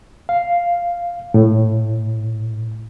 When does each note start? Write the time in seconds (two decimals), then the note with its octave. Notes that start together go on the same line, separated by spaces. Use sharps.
0.29 F5
1.34 A2